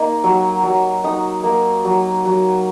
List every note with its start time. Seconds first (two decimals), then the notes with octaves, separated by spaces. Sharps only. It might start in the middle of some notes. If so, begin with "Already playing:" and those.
Already playing: A#3 D#4
0.24 F#3
0.63 F#3
1.04 D#4 D#6
1.44 A#3
1.85 F#3
2.25 F#3